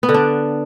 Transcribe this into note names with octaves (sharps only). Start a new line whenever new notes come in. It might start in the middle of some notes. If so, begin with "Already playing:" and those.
B3
D3
D4